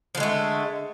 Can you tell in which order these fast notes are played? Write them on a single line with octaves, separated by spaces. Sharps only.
F3 D3 G#3 A3